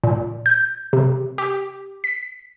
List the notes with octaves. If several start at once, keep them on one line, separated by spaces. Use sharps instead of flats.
A#2
G6
C3
G4
B6